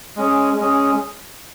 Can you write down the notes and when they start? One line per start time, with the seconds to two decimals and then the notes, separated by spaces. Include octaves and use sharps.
0.16 G#3 C#4 G#4
0.57 G#3 C#4 G#4